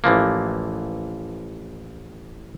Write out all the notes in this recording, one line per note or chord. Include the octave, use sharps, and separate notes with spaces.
A1 E3 F3 A#3